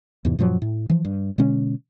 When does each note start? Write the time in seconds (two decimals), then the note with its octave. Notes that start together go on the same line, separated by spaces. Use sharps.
0.25 E2 G#2 C3 E3
0.39 F#2 A#2 F3 F#3
0.62 A2
0.90 E3 F3
1.05 G2
1.38 B2 D3 G#3 C#4